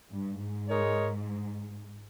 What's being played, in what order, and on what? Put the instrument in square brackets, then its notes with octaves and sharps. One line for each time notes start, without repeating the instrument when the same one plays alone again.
[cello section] G2
G#2
[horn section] G#3 D#4 A#4 C#5